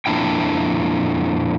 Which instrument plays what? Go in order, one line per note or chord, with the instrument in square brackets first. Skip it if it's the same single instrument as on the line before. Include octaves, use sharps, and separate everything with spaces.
[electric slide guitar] F2 A#2 D4 E4 G5